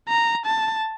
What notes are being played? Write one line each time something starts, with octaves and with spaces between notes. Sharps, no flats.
A#5
A5